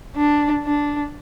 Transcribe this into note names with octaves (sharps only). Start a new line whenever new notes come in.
D4
D4